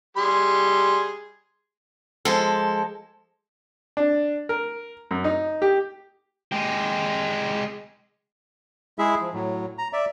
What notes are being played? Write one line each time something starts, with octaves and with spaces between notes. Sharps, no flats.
G3 G#4 C6
F3 G#3 A4
D4
A#4
F#2
D#4
G4
G#3 G4
G#3 E4 G#4 E5
F3
A2 F#3
A#5
D5 E5